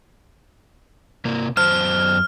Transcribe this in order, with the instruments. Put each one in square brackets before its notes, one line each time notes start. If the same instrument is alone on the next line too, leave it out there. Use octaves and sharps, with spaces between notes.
[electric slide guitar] C3 A#3
[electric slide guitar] F#2 C5 A5 [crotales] F6